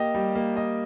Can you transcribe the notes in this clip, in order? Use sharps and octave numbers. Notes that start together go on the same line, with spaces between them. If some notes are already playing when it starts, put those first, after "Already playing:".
Already playing: A#3 G4 D#5
G3
A#3
D#5